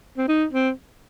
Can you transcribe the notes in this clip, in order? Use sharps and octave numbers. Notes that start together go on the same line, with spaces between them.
C4
D#4
C4